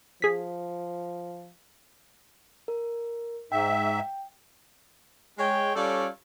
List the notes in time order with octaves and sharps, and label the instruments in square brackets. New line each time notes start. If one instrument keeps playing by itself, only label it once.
[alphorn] F3 [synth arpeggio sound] G#4 B6
[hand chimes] A#4
[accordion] G#2 E5 [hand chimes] G5
[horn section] G#3 C#5 G5
G3 C#4 F4 A4 C#5 D5